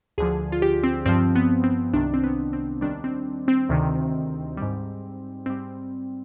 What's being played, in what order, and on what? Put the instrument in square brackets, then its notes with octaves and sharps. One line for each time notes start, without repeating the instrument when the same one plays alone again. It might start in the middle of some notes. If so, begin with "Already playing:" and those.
[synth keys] D2 D3 F3 G#4
F4
G4
C4
G2 F3 C4
B3
C4
C2 C3 D#3 D4
C4
B3
C4
D#2 D#3 G3 D4
C4
C4
D2 C3 D#3
G#2 G3
G#2 G3 C4